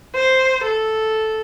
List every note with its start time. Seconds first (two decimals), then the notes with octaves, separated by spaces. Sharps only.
0.15 C5
0.64 A4